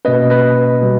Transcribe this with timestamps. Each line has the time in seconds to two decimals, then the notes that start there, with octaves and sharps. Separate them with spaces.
0.05 B2 A#3 C#4 B4 D#5
0.30 B4 D#5
0.82 B2 G3